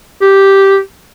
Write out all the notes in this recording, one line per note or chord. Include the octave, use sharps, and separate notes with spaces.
G4